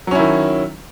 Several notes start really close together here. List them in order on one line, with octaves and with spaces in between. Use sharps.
F#3 C#4 E4 D#3